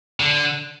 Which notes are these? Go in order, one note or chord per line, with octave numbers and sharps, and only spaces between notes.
D3